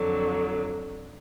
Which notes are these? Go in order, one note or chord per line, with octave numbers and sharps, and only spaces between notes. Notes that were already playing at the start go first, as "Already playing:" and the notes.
Already playing: F2 D3 F#3